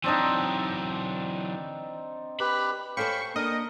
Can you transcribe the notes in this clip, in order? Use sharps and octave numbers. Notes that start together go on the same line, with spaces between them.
E3 F#3 C4 D4 D#4
G4 B4 B5
C#4 A4 C5 F5 G5 B5 C#6
A#3 D4 A#4 D#5